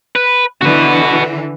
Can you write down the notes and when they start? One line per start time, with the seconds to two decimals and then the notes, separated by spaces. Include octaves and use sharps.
0.15 B4
0.61 D3 E3 F#4 B4